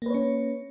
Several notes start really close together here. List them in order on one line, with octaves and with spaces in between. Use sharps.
A#3 B4 C#5 C#4